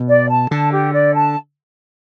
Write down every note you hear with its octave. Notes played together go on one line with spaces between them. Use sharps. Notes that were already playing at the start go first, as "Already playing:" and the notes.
Already playing: B2
D5
A5
D3 A5
G4
D5
A5